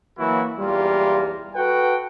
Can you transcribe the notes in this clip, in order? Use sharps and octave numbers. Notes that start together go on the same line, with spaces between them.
E3 F#3 A#3 E4 F#4
B1 E2 G3 A#3 F4
F#4 A4 B4 F#5 G5